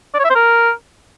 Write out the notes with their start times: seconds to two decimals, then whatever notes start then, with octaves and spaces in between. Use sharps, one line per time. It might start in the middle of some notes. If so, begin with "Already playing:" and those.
0.14 D5
0.19 C#5
0.25 E5
0.30 C5
0.35 A#4